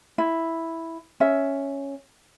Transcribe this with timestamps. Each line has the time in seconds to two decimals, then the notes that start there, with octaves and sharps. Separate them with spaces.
0.18 E4
1.20 C#4 E5